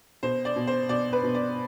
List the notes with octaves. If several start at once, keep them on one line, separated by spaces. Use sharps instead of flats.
B2 C5
D5
B2
C5
B2 D5
B4
B2
D5